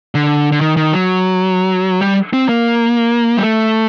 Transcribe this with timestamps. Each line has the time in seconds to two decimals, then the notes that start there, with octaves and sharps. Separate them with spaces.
0.15 D3
0.52 D3
0.61 D#3
0.77 D#3
0.92 F#3
2.01 G3
2.33 C4
2.49 A#3
3.37 G3
3.43 A3